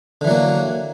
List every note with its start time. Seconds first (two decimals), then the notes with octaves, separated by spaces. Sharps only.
0.21 D3
0.24 E3
0.27 F#3
0.30 A#3